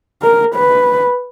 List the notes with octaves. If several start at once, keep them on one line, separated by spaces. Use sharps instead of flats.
A#4
B4